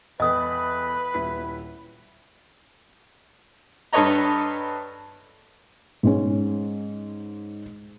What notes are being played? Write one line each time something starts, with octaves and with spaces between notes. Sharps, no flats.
E2 A4 B4 D#5 G5 D#6
D#1 E4 B6
G2 A4 B4 C#5 D#5 A#5
G#2 G#3 C#4